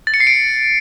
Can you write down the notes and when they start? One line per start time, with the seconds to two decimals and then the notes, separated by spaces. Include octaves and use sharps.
0.07 A6
0.14 C#7
0.20 C7
0.27 D7